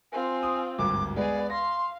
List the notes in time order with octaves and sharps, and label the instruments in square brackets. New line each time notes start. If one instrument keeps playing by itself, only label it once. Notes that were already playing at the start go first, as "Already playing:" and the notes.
[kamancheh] C4 F4 [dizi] G#5
[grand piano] D#6
[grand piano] G#1 D2 G2 [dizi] D6
[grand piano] G#3 [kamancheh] B3 G#4 [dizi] D5
[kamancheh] F5 [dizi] C6 [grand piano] A#6